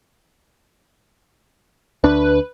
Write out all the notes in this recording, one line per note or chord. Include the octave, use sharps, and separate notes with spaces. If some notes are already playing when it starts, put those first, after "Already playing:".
D2 D4 B4